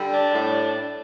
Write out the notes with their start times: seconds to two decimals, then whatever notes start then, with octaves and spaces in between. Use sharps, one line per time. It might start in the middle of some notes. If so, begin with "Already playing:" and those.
Already playing: D3 G3
0.13 D4
0.34 A2